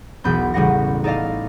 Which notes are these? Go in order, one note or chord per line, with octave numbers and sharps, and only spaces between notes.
E1 B1 B3 B5 G6
A1 C#3 G3 B3 F#5 A#6
D#4 A4 D5 D#5 F5